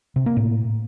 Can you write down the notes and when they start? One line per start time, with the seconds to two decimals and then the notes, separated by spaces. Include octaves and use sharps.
0.16 C3
0.26 A#3
0.37 A2